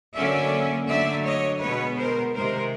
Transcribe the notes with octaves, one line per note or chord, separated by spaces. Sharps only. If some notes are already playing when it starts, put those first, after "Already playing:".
D3 F#3 A#3 C#4 D5 E5
D3 F#3 A3 D5 E5
C#5 D#5
B2 G#3 B3 B4 C#5
A#4 C5
C3 D#3 G#3 A#4 C5